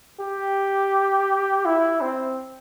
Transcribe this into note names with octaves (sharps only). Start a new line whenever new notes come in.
G4
E4
C4